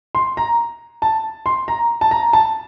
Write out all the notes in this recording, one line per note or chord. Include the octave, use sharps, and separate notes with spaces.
C6
A#5
A5
C6
A#5
A5
A#5
A5